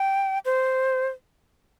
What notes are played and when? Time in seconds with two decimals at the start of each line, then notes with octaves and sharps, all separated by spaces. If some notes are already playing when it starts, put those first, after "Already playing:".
Already playing: G5
0.45 C5